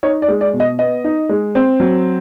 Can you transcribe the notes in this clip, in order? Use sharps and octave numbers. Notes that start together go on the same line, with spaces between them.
D#4 C#5
D5
G#3
D5
B2
D#5
B3 D#5
D#4
G#3
C4
F#3